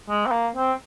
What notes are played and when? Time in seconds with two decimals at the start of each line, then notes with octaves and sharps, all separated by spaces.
0.08 G#3
0.26 C4
0.31 A#3
0.56 C4